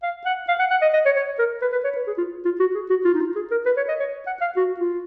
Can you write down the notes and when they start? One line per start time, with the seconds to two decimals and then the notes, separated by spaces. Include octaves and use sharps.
0.03 F5
0.26 F#5
0.48 F5
0.59 F#5
0.71 F#5
0.82 D#5
0.94 D#5
1.05 C#5
1.16 C#5
1.39 A#4
1.62 B4
1.72 B4
1.84 C#5
1.96 B4
2.07 G#4
2.18 F4
2.45 F4
2.60 F#4
2.75 G#4
2.90 F#4
3.05 F4
3.14 D#4
3.20 F4
3.36 G#4
3.51 A#4
3.66 B4
3.77 C#5
3.89 D#5
4.00 C#5
4.27 F#5
4.41 F5
4.57 F#4
4.80 F4